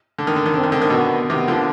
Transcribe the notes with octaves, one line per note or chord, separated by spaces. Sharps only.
D3
D#3
D3
D#3
D3 C4
D#3
D3
D#3
B2 D3 B3
C3 D#3 B3
D3 F3